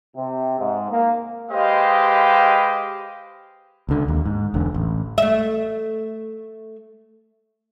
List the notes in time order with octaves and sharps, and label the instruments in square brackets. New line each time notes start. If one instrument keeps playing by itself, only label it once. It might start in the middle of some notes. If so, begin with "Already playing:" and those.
[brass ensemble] C3
G#2
A#3
[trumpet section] G#3 G4 B4 C5 D#5 F5
[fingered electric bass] C#2 D3
D#2
G#2
E1 D3
A1
[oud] A3 E5